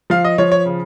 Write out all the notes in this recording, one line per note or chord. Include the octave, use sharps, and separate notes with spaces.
F3 F5
D#5
F3 C#5
C#5
C#3